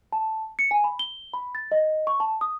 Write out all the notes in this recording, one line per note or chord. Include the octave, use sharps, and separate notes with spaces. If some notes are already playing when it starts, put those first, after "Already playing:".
A5
C#7
G#5
B5
G7
B5
A6
D#5
C#6
A5
D#6